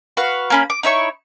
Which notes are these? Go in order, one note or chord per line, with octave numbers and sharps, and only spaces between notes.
F#4 B4 F5
A#3 C#4 B5
D6
D#4 E4 C#5 C#6